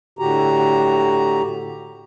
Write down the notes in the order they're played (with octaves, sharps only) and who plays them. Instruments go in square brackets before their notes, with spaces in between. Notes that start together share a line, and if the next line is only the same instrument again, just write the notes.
[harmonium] A2 D3 F#4 G4 A#5